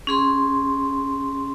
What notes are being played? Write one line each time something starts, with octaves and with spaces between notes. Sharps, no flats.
C#4 G#4 C6